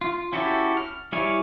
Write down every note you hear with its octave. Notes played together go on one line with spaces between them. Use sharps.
F4
C#4 E4 F#4 G4 A4
F6
G3 E4 C#5 F5 G#5